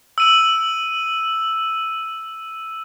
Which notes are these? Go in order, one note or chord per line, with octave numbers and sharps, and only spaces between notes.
E6 D#7 F#7